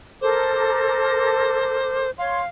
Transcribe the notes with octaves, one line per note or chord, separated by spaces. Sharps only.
A4 A#4 C5 D6
C#5 F5 C6